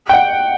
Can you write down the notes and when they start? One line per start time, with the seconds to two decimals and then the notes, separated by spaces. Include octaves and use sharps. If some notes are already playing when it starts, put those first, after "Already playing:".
0.09 G5
0.14 F#5